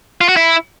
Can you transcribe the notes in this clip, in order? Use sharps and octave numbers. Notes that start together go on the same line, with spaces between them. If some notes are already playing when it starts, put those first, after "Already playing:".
F4
F#4
E4